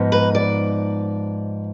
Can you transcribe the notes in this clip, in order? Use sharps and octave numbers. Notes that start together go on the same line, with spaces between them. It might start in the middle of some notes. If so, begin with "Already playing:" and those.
Already playing: G#2 F3 B3 D#4
B4
D5